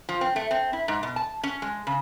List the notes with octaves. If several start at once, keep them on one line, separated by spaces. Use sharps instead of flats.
F3
C4
A3
C4
E4
G#2
B2
A5
C#4
G#3
C#3